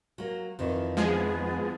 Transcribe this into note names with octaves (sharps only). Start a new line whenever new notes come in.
F#3 A#3
F2 D#3 E3
F3 G#3 B3 G#4